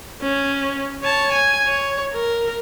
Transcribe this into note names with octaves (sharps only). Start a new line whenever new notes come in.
C#4
C#5 A5
G#5
C#5
A#4